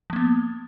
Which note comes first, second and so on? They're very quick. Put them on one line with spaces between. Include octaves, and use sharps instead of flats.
F3 A#3 B3